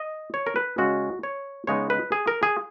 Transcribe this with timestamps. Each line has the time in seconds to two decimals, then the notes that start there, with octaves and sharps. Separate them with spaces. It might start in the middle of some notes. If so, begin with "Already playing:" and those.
Already playing: D#5
0.34 C#5
0.47 A#4
0.56 B4
0.78 C#3 G#3 C#4 F#4
1.23 C#5
1.67 C#3 G#3 B3 D#4 C#5
1.90 B4
2.12 G#4
2.28 A#4
2.43 G#4